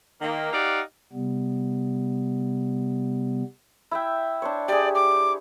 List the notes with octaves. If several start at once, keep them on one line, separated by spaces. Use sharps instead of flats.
D#3 A#3
D#4 G4 D5 F5 F#5
C3 G3 B3
E4 E5 G5
D4 C5 C#5
G4 G#4 D5
D6